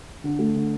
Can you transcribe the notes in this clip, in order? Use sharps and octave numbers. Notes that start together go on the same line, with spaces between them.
D3
A3
D3